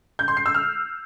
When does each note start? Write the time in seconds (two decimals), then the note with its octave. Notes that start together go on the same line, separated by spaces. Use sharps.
0.19 G6
0.28 C6
0.37 C7
0.46 E6
0.54 F6